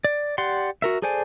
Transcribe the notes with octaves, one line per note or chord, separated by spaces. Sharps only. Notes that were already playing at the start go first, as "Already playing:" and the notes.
D5
G4 D5 F#5 C6
F#4 A#4 E5
G#4 A4 C5 D5 G#5